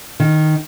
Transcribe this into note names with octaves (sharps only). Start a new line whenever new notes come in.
D#3